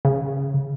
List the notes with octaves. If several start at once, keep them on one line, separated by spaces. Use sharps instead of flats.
C#3